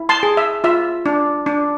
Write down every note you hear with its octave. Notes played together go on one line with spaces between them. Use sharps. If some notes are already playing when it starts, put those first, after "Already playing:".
Already playing: E4
A5 C6
G#4
E5
F4 E5
D4
D4